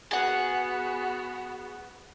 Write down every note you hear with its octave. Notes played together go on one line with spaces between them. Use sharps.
B3 F#4 G#4 F#5